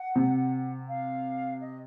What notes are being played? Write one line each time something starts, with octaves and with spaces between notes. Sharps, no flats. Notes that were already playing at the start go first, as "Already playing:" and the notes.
Already playing: F#5
C3
F5
D#5